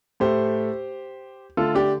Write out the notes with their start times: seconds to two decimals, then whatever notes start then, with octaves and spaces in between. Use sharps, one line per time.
0.20 A2 A3 G4 C5
1.57 D3 A3 F4 A4
1.75 D4 G4